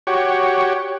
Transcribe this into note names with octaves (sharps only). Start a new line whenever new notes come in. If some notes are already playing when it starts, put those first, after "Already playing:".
F#4 G4 C#5